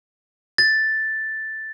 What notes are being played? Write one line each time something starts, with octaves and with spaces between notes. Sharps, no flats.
A6